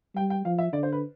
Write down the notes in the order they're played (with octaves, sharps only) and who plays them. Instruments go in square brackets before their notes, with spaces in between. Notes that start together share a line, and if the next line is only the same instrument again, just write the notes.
[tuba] G3 [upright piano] G5
[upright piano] G5
[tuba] F3 [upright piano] F5
[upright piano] E5
[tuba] D3 [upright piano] D5
[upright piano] C5
B4